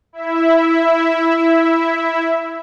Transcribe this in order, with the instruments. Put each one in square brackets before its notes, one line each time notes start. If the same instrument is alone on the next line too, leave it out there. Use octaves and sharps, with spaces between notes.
[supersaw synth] E4 E5